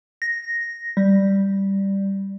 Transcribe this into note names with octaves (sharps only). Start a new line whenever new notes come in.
A#6
G3